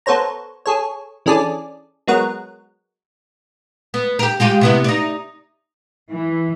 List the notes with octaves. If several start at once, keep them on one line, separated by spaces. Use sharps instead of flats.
B3 A4 C5 C#5 A#5
G#4 A4 C#5
E3 C#4 D4 G#4 A4 D5
F#3 G#3 B3 A#4 C#5 F#5
B3
G4 A#4
G#3 F4 G4
C3 B3 E4
D#4 D5
E3